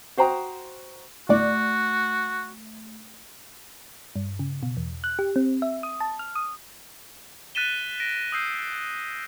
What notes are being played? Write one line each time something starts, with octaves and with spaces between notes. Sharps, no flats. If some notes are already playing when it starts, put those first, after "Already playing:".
F#4 C5 G5 A#5 D#6
G1 A2 A3 F#4 D5
G2
C#3
B2
E2
F#6
G4
C4
E5
D#6
A5
F6
D#6
F#6 A6 B6 D#7 E7 G7
A#6 D7
D#6 E6 G6 C7